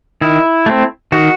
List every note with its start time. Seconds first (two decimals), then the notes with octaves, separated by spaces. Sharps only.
0.21 D#3 E4
0.66 A3 C4
1.12 D#3 F#4